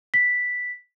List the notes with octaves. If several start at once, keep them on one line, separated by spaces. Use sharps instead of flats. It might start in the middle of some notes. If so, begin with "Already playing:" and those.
B6